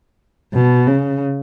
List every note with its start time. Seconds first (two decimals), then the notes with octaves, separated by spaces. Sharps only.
0.53 B2
0.87 C#3